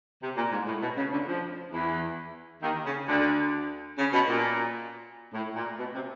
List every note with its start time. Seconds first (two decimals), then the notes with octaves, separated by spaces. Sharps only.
0.22 C3
0.36 A#2
0.51 G#2
0.66 A2
0.81 B2
0.97 C#3
1.11 D2 D3
1.26 F2 F3
1.72 E2 E3
2.62 D#2 D#3
2.85 C#3
3.07 D2 D3
3.98 C#3
4.12 B2
4.28 A#2
5.33 A2
5.56 A#2
5.78 B2
5.93 C3